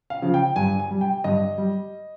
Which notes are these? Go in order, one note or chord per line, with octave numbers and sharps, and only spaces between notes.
F5
C#3 F3
G5
G2 G#5
G#5
G3
G5
G2 D#5
G3